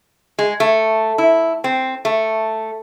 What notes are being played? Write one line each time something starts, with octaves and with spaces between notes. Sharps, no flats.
G#3
A3
E4
C4
A3